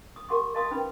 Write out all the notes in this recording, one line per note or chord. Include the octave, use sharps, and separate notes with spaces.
D#6
G4 A#4 F#5 C6 D6
A#4 D#5 F5 A5 C6 D#6
C#4 D#4 B4 G5 B5